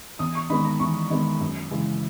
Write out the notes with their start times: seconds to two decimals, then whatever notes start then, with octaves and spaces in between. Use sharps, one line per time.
0.19 E2 D#6
0.35 C#6
0.50 D#3 G#3 B3 B5
0.65 A#5
0.80 E2 C#6
1.10 D#3 G#3 B3
1.40 F#2
1.71 C#3 E3 G#3